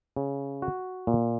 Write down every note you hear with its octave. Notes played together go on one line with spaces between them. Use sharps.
C#3
F#4
A#2